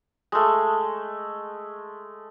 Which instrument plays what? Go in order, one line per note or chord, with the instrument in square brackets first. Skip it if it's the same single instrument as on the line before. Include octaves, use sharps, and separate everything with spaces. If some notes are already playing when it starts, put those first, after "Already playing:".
[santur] G#3 A3